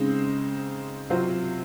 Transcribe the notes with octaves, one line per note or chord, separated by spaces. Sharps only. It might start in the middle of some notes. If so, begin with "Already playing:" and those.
Already playing: C#3 G#3 C4 D#4
C3 F#3 C4 F4 C5